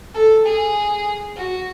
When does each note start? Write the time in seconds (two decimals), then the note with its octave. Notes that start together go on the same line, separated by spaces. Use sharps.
0.14 A4
0.45 G#4
1.36 F#4